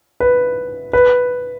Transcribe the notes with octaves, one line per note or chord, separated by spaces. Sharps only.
B4
B4